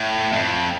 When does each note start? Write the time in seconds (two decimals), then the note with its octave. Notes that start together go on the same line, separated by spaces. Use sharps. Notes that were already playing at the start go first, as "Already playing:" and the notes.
Already playing: A2
0.32 F2